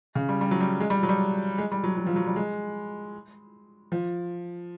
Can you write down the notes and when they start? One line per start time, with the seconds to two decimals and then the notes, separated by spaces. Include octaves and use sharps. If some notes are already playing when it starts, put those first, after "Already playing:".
0.15 C#3
0.29 G3
0.41 G3
0.51 F#3
0.61 G3
0.80 G#3
0.90 G3
1.03 F#3
1.09 G3
1.58 G#3
1.72 G3
1.84 F#3
1.97 F#3
2.06 F3
2.16 F#3
2.26 G3
2.36 G#3
3.92 F3